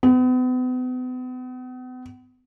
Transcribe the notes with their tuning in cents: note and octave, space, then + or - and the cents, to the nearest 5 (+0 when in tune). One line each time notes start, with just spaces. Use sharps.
B3 +40